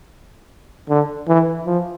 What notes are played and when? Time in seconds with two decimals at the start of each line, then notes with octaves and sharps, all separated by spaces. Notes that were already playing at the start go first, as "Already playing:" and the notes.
0.89 D3
1.28 E3
1.66 F3